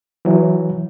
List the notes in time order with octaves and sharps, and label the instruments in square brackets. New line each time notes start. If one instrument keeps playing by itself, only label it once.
[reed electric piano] E3 F#3